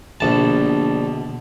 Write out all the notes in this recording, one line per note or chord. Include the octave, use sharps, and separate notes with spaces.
A#1 B2 D3 G4 A5